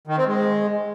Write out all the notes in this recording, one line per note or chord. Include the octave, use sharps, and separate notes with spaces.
D#3
C4
G#3